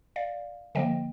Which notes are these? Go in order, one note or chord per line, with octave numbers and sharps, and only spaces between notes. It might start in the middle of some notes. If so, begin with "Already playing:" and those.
D5 F5
D3 F3 A#3 D#5 G5